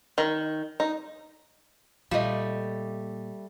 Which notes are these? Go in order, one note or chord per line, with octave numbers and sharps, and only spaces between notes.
D#3
D#4
A#2 G3 A3 F4 D#5